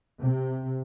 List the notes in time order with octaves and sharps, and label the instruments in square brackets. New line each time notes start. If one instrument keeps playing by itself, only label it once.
[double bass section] C3